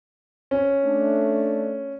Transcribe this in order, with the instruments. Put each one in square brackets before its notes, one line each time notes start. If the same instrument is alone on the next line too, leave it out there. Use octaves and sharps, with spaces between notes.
[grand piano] C#4
[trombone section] A3 D4